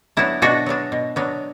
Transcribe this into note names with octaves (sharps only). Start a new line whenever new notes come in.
F#3 B3 D4 E4
B2 D4 F#4
F#3 B3 D4
B2
F#3 B3 D4